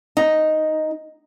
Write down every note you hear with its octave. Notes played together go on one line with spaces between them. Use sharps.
D#4